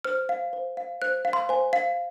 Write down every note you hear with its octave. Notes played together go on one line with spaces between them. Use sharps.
C5 F6
F5
C5
F5
C5 F#6
F5
C6
C5 G#5
F5